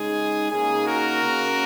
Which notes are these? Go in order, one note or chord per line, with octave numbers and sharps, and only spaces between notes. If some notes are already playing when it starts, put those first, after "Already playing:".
Already playing: C#3 G#3 D#4 G#4
C#3 A#3 D#4 G#4
F#4 A#4
C#3 A#3 C#4